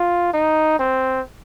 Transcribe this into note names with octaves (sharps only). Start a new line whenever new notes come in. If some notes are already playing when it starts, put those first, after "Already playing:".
Already playing: F4
D#4
C4